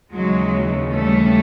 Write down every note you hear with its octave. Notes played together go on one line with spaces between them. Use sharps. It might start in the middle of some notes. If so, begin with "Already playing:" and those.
D#2 C#3 E3 F#3 G#3
G3 A3